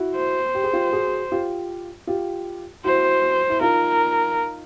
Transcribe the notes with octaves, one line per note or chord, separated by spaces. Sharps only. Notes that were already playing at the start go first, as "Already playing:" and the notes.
Already playing: E4 F#4
C5
G4
G#4
F4 G4
F#4 G#4
F4 G4
F4 G4
E4 F#4 C5
E4
D#4 F4 A#4